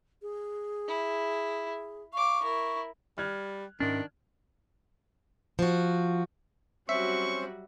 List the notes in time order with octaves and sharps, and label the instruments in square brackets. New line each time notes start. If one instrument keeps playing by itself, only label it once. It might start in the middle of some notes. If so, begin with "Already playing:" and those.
[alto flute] G#4
[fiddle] E4
[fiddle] F5 D6 [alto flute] C#6
[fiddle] E4 A#4
[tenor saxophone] G3 [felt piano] F6 F#6 G#6
[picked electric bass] G#2 C#4 [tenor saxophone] D#3 [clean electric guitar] D4
[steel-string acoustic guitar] F3 F#4
[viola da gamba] F#3 G3 F#4 [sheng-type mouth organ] C4 C#4 C5 [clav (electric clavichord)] E5 [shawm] C#6